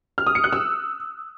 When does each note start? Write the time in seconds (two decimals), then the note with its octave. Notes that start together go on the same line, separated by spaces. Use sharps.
0.18 F6
0.27 D#6
0.35 C#7
0.44 F#6
0.53 E6